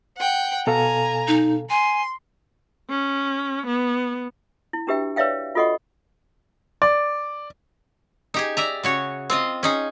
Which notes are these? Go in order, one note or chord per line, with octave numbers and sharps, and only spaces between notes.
F#5 G5
B2 A4 F5 G#5 A#5
D#4
G#5 C6
C#4
B3
E4
D4 F#4 G4 B4 E5 G5
B4 C#5 D5 E5 F5 G5
F4 F#4 A4 D#5 F#5 C#6
D5
D#4 G4 G#4
D5 E5 A#5
C#3 F#4 C#5
C4 F4 D#5
C#4 D#4 G#4